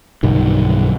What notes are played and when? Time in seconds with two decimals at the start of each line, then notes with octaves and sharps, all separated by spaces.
0.23 B1 G2 D3 D#3